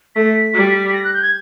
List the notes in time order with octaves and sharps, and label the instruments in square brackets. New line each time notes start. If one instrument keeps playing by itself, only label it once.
[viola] A3 [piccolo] B6
[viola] G3
[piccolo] A#6
F#6
G6
G#6